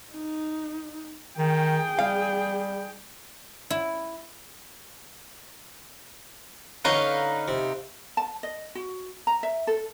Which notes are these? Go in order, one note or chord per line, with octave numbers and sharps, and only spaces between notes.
D#4
D#3 G#4 G5
G3 F5
E4
D3 C#4 D#4 B4 F5
C3
A5
D#5
F#4
A#5
E5
A4